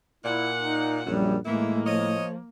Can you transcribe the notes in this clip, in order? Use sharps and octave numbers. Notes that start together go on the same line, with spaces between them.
A#2 E4 F#5
D#4
A#1 F#2 G3
A2 D#3 E3 G#3 A#3 E4
F3 C#5 D#5